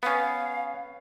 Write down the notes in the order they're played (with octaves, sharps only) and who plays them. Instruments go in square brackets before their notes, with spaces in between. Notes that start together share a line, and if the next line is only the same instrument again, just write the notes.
[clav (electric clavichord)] B3 C#4 [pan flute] F5